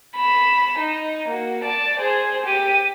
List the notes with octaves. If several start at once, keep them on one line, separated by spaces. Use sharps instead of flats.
B5 E7
D#4
A#3 F#4
D5 A5
G#4 C5
G4 D#7